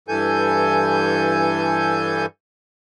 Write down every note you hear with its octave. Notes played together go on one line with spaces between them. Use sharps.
G2 E3 A4 G#5 G6